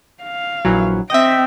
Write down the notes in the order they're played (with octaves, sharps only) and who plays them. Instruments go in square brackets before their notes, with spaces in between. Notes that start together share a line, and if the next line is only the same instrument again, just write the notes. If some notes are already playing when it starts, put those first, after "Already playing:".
[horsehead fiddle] F5
[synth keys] A#1 E3 F#3
[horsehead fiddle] C4 G5 [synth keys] D#5 E5